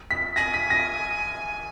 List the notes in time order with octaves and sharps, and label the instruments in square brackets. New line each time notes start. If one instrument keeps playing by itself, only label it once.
[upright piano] B6
[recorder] G#5 [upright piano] A#6
[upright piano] B6
A#6